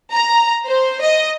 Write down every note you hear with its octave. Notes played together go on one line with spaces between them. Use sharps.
A#5
C5
D#5